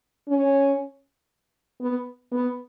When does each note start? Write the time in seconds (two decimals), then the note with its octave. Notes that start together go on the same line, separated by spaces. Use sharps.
0.28 C#4
1.81 B3
2.32 B3